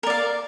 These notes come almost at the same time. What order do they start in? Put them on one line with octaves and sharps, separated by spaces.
A#4 D5 F5